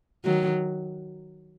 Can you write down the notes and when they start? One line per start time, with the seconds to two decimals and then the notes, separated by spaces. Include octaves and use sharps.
0.25 D#3 F#3